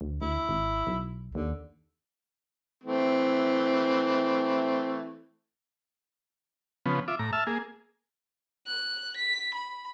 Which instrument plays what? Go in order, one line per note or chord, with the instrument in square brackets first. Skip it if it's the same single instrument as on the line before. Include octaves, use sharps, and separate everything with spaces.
[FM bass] D2
[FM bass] D2 [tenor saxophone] E4
[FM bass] G#1
B1
[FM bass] D#2 [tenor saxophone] D3
[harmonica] E3 A3 C4
[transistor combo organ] C#3 F3 B3
F4 E5 D6
A2 A#5
E5 A5 E6 F6
A#3 G#4
[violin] F#6
B6
B5